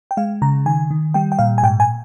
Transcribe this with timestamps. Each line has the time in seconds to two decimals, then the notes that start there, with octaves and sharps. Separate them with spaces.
0.11 G5
0.17 G#3 F5
0.42 C#3 A#5
0.66 D#3 G#5
0.91 D#3
1.14 G3 G5
1.32 G5
1.39 A#2 F5
1.58 G#5
1.63 G#2 G5
1.80 G#5